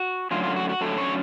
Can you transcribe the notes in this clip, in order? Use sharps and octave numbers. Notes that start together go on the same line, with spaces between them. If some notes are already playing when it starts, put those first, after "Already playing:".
Already playing: F#4
F#2 D3 F#3 A3 C#4 F4
F4
F#4
F#4
F#2 D3 F#3 A3 C#4 A4
C#5